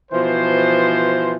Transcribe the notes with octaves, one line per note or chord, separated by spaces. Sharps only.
B2 E3 F3 C5